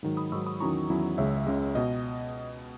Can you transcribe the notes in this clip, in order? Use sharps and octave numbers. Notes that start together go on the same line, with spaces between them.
G#2 D#3 F#3
B5 D#6
G#2 D#3 F#3 C#6 E6
B5 D#6
E2 D#3 F#3 C#4 E4 A#5 C#6
E2 D#3 F#3 C#4 E4
C#2 C#3 G#3 C#5 E5
C#2 C#3 G#3
B2 D#5